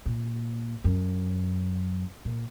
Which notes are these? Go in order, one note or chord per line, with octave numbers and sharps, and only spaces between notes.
A#2
F#2
A#2